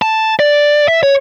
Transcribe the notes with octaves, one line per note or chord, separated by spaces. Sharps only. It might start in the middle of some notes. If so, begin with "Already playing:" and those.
A5
D5
E5
C#5